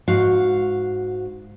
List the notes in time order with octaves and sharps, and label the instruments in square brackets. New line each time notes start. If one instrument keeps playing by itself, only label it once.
[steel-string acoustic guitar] G#2 F#4 F5